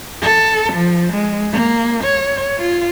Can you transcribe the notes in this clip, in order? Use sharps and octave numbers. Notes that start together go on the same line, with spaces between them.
A4
F3
G#3
A#3
C#5
F4